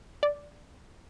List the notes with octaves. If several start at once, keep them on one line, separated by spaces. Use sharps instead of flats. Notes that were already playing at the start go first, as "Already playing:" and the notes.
D5